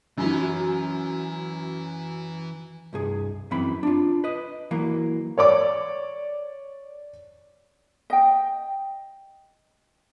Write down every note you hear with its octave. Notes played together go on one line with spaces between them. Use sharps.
F#2 E3 F#3 B5
C2 G2 G#4
F#2 E3 C4 B5
D4 F4
B4 D#5
E3 F#3 A#3
C#5 D5 D6
D#5 G5